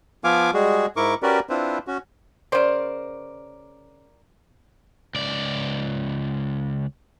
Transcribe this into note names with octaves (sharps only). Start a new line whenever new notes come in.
F3 B3 F4 F5 G#5 D6
G3 G#3 F#4 G#4
G#2 E4 A#4 C#6 D6
C#4 F#4 G4 A#4 B4 D5
C4 D4 E4 F4 B4 C5
C#4 F#4
C#3 A#4 C5 D5
C#2 D5